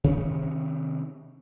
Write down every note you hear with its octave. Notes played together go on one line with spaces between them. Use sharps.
C3 D#3 C#4